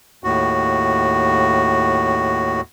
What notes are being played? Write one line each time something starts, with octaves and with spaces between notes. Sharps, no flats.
D#2 A2 F#4